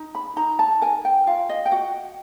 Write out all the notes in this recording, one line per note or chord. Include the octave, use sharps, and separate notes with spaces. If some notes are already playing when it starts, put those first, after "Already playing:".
Already playing: D#4
B5
D#4 A#5
A5
A#4 G#5
G5
F4 F5
D#5
G5
F#4 F#5